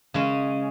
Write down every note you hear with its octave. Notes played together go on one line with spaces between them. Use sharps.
C#3 G#3 C#4